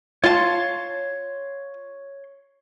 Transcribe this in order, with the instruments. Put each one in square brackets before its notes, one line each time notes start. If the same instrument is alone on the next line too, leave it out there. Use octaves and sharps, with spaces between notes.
[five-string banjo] F4 A5 [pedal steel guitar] C#5 C6